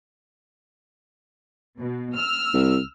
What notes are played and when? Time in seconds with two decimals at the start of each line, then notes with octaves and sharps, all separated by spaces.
1.78 B2
2.15 E6 F6
2.54 C2